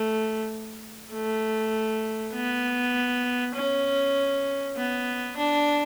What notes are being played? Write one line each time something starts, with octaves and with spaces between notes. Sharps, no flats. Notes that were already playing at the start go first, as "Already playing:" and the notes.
Already playing: A3
A3
B3
C#4
B3
D4